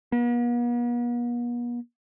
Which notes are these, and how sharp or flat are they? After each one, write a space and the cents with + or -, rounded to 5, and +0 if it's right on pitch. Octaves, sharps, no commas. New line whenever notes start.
B3 -45